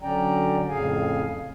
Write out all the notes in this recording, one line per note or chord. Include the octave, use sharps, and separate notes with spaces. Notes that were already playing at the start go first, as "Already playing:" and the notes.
D3 F#3 C#4 D5 G5 A#5
F2 A2 C#3 G#4 F5 G#5